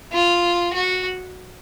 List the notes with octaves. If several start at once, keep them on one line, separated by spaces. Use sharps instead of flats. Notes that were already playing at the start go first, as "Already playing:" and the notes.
F4
F#4